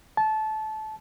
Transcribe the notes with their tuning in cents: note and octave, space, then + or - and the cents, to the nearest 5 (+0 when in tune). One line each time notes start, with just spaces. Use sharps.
A5 -20